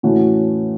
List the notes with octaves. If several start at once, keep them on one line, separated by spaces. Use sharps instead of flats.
A2 E3 A3 C#4 F#4